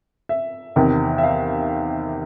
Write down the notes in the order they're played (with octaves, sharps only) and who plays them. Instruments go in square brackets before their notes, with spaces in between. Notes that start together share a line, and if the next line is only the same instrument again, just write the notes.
[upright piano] E5
E2 C3 D#3
E5
F5